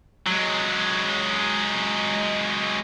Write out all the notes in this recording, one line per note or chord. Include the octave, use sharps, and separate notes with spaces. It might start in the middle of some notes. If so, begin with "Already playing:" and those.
F#3 G#3